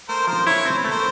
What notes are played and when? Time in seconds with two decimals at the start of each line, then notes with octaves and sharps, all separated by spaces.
0.09 A3 A#4 C5
0.27 F3 A#4 C5
0.47 E4 B4 C#5
0.65 C4 C5
0.78 B4
0.84 A3
0.91 A#4 C5